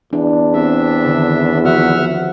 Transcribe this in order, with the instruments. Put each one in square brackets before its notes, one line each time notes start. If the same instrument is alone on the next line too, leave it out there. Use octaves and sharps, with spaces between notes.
[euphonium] E2 [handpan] D4
[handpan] C4 G4 [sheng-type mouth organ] D4 E5
[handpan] D3 D#3
[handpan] D3 F3 F#4 [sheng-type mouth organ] E5 F#5 F6